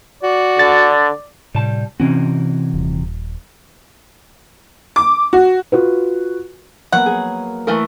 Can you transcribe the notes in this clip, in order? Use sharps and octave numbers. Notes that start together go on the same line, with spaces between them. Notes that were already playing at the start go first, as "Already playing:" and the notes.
F#4 D5
D3 A6
A2 C3 G3 A5
C3 E3 C4 C#4 F#4
D#1
D6
F#4
F4 F#4 B4
F#3 A#3 B3 F#5
G#4
E3 A3 A#4 C#6 B6